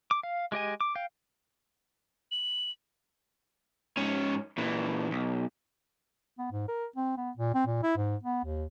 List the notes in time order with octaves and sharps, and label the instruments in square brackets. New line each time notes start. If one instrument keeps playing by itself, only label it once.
[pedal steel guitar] D6
F5
G#3 G4 D#5 G#5
D6
F5 G5
[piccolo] F#7
[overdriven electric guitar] G#2 C#4
A#2 E3
B1
[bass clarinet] B3
G#2
A#4
C4
B3
A#2
C4
A#2
E4
G#2
B3
D#2